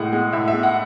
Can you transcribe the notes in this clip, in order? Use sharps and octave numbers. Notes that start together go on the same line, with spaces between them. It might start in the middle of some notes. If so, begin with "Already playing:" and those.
Already playing: A2 G#3 F#5
G#3
A2 E5
E5
G#3
F#5